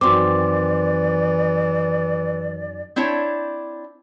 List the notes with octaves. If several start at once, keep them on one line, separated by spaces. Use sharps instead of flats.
F#2 D#3 E3 C4 F#4 D5 C6 D6
C4 D4 E4 C#5